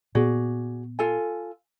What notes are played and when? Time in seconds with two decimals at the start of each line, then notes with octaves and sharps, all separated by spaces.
0.15 A#2 B3 F#4 G#4 D5
0.99 F4 A4 G#5